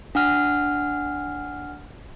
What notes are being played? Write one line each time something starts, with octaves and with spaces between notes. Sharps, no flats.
D4 F#5 F6